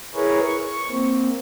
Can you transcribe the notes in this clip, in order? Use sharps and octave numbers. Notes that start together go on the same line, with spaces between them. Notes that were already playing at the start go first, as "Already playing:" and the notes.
E4 G#4 A#4 B4 C#5
C#6
A#3 C4